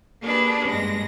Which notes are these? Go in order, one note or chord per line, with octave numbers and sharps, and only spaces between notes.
A#3 D4 G4 G#4 B4
G2 G#3 A#6